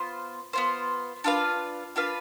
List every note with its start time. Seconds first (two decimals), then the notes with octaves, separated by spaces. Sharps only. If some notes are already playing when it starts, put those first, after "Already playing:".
Already playing: B3 F4 C5
0.53 B3 F4 C5
1.24 D4 F4 B4 F5
1.96 D4 F4 B4 F5